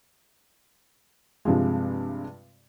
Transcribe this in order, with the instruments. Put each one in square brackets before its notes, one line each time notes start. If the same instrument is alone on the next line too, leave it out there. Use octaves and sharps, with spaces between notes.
[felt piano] G2 C3 F3 G#3